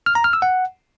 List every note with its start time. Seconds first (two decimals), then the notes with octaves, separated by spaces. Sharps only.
0.06 F6
0.15 A#5
0.24 F6
0.33 E6
0.42 F#5